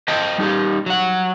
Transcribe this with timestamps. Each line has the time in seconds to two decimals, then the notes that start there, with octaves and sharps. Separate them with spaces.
0.08 C5 D#5 G5 A5
0.38 G3 D#4 F#4 G4
0.86 F#3 F#5